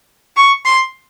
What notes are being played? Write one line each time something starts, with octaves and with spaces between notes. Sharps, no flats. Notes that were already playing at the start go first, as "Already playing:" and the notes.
C#6
C6